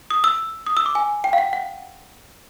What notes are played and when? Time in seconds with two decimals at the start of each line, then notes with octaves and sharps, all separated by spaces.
0.11 D#6
0.24 E6
0.67 D#6
0.77 E6
0.86 D6
0.95 G#5
1.24 G5
1.33 F5
1.38 F#5
1.53 F#5